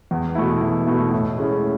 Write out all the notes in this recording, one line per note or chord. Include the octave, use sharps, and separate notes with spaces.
E2
B2 A3 E4
E2
B2 A3 E4
A2
G#3 C#4 E4